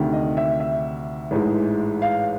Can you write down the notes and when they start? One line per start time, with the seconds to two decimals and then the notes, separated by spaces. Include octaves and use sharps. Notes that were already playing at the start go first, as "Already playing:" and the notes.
Already playing: D2 C3 D#3
0.13 D#5
0.37 E5
0.60 E5
1.31 A1 G#2 E3 G#3
2.02 F5